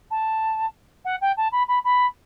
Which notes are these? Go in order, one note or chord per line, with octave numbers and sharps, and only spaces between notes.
A5
F#5
G5
A5
B5
B5
B5